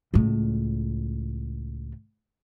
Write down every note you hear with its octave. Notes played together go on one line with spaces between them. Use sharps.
C#2 A2